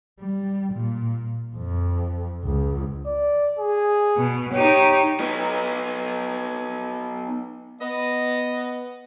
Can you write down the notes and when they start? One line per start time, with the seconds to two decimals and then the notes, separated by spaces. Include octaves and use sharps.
0.20 G3
0.74 A#2
1.56 F2
2.44 C#2
3.06 D5
3.59 G#4
4.17 B2
4.53 D#4 G4 C#5
5.20 B3 D#4
7.82 B3 D#5